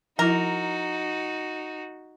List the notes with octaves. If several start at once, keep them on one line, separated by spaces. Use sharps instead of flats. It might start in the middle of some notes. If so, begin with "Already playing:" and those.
F3 D#4 E4 F#4 A#4